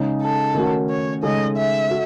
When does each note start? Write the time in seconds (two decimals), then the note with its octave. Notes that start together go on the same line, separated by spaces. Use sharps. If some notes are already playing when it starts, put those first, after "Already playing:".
Already playing: C#3 G#3 D#4
0.22 A4
0.55 D#3 A3 C#4 F#4
0.90 C#5
1.23 C#3 G#3 D#4 A4 D#5
1.57 E5
1.90 F#4 A4